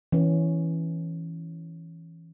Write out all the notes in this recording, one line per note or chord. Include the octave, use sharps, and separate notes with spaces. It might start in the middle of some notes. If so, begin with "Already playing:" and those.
E3 C#4